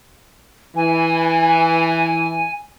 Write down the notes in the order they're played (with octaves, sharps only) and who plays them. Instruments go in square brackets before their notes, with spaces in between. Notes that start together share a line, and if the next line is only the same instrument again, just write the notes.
[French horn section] E3 [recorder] G#5